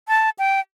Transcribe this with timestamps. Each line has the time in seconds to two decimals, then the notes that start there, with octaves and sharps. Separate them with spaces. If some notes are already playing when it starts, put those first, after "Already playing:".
0.08 A5
0.39 G5